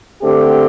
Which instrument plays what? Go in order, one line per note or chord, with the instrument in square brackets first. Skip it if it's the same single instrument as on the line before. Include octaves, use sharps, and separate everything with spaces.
[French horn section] D3 A3 C4 G4